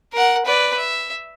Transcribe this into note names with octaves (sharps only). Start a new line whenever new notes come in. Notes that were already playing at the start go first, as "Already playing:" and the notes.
A#4 F#5
B4 D5
E5